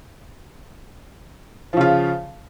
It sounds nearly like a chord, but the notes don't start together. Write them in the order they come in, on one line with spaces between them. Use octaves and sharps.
F3 C#3 F4